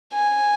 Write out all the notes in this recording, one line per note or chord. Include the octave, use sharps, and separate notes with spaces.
G#5